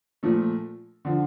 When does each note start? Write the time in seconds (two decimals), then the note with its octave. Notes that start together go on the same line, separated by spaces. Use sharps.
0.23 A#2 F3 A3
1.05 D3 F3